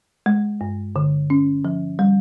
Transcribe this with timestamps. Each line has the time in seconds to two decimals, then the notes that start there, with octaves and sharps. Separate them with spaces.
0.26 G#3
0.61 G2
0.96 D3
1.30 C#4
1.65 F3
1.99 G3